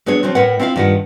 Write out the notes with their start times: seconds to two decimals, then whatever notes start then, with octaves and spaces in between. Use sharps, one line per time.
0.06 F#3 B3 D4 G#4 C#5
0.23 F3 F#3 C4 F#4
0.35 A2 A#4 B4 C#5 F#5
0.60 C4 E4 F4 E5 F5
0.76 G2 D#3 G3 F4 F#5